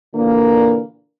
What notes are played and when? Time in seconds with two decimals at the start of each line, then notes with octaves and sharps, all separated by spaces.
0.15 A#2 D3 E3 A#3